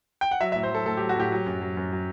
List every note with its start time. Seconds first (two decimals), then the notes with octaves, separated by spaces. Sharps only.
0.21 G5
0.31 F#5
0.41 F#3 E5
0.52 A2 E5
0.63 C5
0.70 F#3 A4
0.86 A2 A4
0.97 F#3 G4
1.09 F#4
1.16 A2 G4
1.31 F#3
1.46 F#2
1.61 F#3
1.77 F#2
1.92 F#3